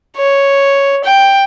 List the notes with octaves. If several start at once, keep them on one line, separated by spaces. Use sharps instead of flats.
C#5
G5